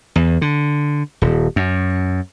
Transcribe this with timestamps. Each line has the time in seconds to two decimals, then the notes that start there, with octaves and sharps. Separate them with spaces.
0.16 E2
0.42 D3
1.22 D#1
1.56 F#2